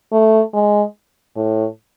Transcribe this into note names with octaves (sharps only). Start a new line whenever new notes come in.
A3
G#3
A2